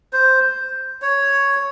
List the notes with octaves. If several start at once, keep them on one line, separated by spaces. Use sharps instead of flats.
C5
C#5